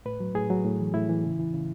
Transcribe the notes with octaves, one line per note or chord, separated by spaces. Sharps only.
A2 B4
F#3
A2 G#4
F#3
A2
E3
A2 E4
E3
C#3
E3
C#3